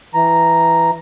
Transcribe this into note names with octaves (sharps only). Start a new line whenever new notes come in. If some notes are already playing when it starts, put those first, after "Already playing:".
E3 A#5